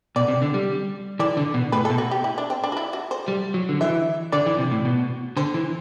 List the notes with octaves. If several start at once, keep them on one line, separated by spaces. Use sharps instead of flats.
B2 D5
C3
D3
G3
E3 D5
D3
B2
A2 B4
A4
B2
F#4
G4
E4
D4
C4
D4
F#4
E4
F#4
C5
G3
F#3
D3
E3 E5
D3 D5
E3
C3
A2
B2
D3 C5
E3